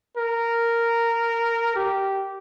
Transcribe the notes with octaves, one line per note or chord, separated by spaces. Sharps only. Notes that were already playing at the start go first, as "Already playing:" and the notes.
A#4
G4